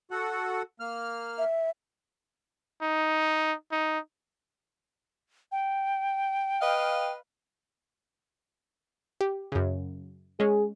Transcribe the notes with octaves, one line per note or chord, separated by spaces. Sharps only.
F#4 A4 F#5
A#3 F6
E5
D#4
D#4
G5
B4 D#5 F5
G4
F#2 C#3
G#3 C#4 G#4